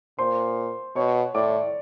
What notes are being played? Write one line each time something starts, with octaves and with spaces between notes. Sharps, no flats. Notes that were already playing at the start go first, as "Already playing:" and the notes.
A#2 C5 C6
B2 C#5 C#6
A2 D5 D6